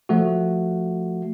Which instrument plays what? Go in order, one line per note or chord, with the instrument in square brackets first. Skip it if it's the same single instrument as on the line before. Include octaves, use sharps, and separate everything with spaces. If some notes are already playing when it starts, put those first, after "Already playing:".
[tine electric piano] F3 A3 F#4